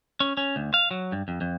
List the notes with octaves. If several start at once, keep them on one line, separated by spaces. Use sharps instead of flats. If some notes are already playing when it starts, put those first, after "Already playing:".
C#4
C#4
D2
F5
F#3
G2
F2
F2